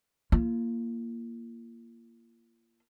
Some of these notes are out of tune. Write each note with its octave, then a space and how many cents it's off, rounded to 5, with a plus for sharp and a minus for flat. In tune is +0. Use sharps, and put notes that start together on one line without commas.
A#3 +0 F4 -35